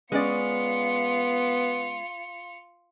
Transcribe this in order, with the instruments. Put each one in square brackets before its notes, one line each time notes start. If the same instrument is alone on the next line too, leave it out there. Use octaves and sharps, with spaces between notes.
[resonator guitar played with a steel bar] G#3 C#4 D5 [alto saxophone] B3 [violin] F4 C#7